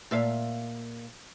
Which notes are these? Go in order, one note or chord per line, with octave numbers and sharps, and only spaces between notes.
A#2 E5 F5